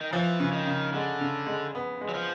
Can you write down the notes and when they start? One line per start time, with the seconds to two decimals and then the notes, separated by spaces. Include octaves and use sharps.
0.01 D#3
0.13 E3 F3
0.40 C#3
0.52 D#3
0.67 C#3
0.93 D3 G#3
1.21 C#3
1.47 G#3
1.75 B3
2.01 G#3
2.09 F#3
2.14 F3